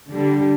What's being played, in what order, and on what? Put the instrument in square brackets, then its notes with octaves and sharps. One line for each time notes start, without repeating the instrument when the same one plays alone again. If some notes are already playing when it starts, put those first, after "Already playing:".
[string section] D3 G3